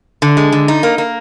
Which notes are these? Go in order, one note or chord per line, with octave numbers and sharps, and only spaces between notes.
D3
G#3
D3
D#4
A#3
A#3